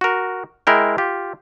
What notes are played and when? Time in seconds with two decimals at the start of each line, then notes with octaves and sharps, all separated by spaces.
0.01 F#4 A#4
0.67 G#3 E4 A#4 G5
0.98 F4 G4